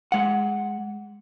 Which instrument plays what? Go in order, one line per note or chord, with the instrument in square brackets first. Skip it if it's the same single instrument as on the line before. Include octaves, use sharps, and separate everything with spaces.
[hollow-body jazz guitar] G#3 F#5